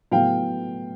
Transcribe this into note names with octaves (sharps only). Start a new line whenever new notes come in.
A2 F#3 B3 F5 G5